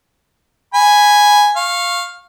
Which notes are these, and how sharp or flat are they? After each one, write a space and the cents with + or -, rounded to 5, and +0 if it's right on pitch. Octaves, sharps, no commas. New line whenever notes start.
G#5 +0 B5 +0
F5 +0 C#6 -25